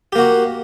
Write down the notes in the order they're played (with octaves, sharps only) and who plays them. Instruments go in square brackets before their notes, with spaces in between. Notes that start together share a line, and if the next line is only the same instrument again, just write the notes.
[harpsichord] G4
A#3
F#4